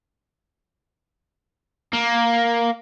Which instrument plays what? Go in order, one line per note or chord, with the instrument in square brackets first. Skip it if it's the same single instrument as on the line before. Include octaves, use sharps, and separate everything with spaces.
[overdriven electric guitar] A#3